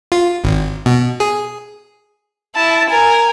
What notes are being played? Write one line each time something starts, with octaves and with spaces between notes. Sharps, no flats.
F4
G#1
B2
G#4
E4 A5
A#4 G#5